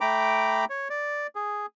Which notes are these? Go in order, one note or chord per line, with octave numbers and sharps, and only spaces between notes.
A3 G5 A#5 B5 D6
C#5
D5
G#4